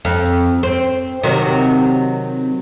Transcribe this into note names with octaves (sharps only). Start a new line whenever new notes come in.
F2
C4
C3 D#3 F#3